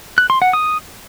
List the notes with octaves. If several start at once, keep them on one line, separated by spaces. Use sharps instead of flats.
F#6
C6
F#5
D#6